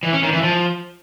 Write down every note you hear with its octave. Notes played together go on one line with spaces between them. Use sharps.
E3
C#4
D#3
E3
F3